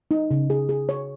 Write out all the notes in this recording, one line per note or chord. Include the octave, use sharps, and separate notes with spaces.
D#4
C#3
G#4
G#4
C#5